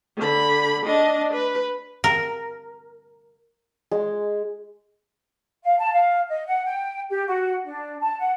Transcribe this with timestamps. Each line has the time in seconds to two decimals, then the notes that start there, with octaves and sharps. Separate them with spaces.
0.17 D3 B5
0.86 D4 D#5
1.33 B4
2.04 A#4
3.91 G#3
5.64 F5
5.78 A5
5.93 F5
6.29 D#5
6.46 F#5
6.66 G5
7.09 G4
7.26 F#4
7.65 D4
8.00 A5
8.19 F#5